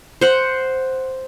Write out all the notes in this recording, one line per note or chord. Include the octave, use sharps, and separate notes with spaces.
C5 F#5